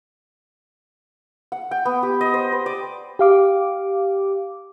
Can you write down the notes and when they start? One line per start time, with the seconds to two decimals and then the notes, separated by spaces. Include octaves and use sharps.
1.52 F#5
1.71 G5
1.85 B3
2.03 G4
2.21 D#5
2.34 C5
2.52 B4
2.66 D5
3.19 G4 F5 D6